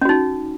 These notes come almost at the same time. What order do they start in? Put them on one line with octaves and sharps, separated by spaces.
C#4 F#4 D#4